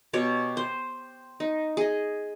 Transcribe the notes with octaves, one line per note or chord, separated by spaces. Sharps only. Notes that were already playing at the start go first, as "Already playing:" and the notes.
B2 G4 C#5
C5
D#4
G#4 D#5